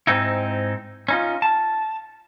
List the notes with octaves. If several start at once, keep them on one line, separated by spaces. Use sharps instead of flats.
G#2 C4 D#4 E4
C#4 D#4 F4
A5